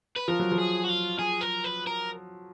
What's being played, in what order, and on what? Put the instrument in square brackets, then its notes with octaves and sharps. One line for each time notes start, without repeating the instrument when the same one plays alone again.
[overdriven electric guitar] B4
[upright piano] F3 [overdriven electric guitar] A#4
[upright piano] F#3
F3
[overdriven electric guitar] G#4
F#4
F4
G#4
A#4
B4
A#4